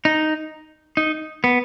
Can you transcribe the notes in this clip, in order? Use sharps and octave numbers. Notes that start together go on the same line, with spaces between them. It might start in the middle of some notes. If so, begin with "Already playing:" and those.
D#4
D#4
B3